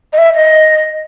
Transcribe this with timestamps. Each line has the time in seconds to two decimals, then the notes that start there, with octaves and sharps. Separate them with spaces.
0.12 D#5
0.18 E5
0.34 D#5